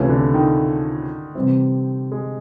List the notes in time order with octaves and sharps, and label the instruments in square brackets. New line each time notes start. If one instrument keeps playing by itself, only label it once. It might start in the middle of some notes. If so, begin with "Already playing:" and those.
Already playing: [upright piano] C#2 C3 E3 A3 C#4
[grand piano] D3
D#3
[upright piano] C3 E3 G3 C4
[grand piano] G#3